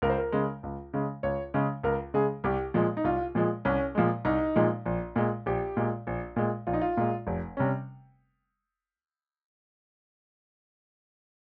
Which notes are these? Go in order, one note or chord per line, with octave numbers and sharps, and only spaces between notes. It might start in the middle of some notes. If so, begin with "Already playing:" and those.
C#2 A#4
C5
A#4
C#3 G#3
C#2
C#3 G#3
C#2 C#5
C#3 G#3
C#2 A#4
C#3 G#3 G#4
C2 G4
A#2 F3 G#3
D#4
C2 F4
A#2 F3 G#3
C2 C#4
A#2 F3 G#3
C2 D#4
A#2 F3 G#3
A#1
A#2 G#3
A#1 G4
A#2 G#3
A#1
A#2 G#3
A#1 F4
D#4
F4
A#2 G#3
F1
C3 G3 C#4